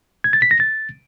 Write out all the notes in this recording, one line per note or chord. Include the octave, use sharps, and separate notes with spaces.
G#6
A6
B6
A#6
A6